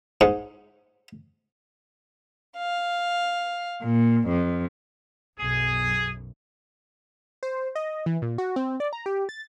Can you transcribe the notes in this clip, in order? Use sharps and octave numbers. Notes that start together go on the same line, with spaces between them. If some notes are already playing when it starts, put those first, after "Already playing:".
G#2
F5
A#2
F2
B1 F#2 G#4
C5
D#5
E3
A#2
F#4
C4
D5
A#5
G4
A6